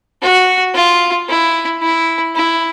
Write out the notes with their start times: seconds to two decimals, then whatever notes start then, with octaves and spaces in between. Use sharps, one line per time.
0.22 F#4
0.74 F4
1.29 E4
1.82 E4
2.35 E4